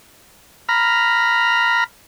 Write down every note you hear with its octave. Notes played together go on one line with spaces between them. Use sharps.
A#5 B5 F6